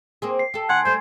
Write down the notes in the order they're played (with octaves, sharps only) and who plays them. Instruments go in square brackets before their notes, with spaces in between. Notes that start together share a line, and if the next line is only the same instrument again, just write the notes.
[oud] A#3 C4 G#4
[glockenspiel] C7
[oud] G4 A4
[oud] D#2 [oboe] F#5 [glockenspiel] G#5 C6 G#6
[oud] G3 A3 [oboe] C5